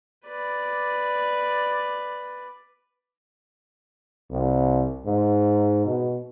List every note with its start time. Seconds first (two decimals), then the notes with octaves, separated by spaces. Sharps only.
0.25 B4 D5
4.30 C2
5.05 G#2
5.86 B2